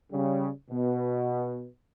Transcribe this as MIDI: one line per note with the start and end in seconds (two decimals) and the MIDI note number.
0.12 0.47 49
0.12 0.47 55
0.70 1.66 47